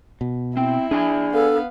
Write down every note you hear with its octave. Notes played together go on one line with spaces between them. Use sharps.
B2
C4 E4
D4 G#4 D5 G#5
B3 A4 F5